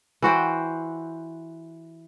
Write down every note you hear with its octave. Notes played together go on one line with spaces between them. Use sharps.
E3 F#4 C5 G5